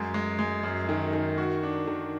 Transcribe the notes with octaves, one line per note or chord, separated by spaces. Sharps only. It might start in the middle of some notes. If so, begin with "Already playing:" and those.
Already playing: F#2 G#3
G#3
G#3
F#2
D#3
D#3
F#4
D4
D#3